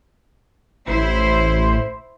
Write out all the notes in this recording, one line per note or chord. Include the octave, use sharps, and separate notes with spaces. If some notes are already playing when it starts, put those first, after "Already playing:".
A1 E4 C5